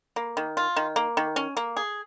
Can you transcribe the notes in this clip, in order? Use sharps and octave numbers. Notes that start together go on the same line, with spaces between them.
A#3
D#3
F4
D#3
A#3
D#3
C#4
A#3
G#4